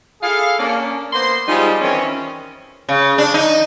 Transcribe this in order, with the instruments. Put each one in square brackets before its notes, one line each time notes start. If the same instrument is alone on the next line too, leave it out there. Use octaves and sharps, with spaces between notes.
[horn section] E4 G#4 A4 F5
A#3 C#4 D4
A#3 B3 C5 C6
F3 G3 G#3 D#4 F4 G#4
D#3 E3 C4 C#4
[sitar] C#3
D4
D#4